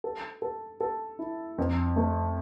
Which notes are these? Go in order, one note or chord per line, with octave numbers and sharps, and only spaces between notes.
A4
A4
A4
E4
F2
A3